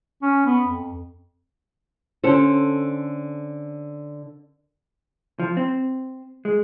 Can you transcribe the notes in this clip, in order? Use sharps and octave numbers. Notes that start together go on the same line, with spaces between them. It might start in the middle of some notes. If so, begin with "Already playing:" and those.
C#4
B3
F2
D3 C#4 A4 C5
F3
C4
G#3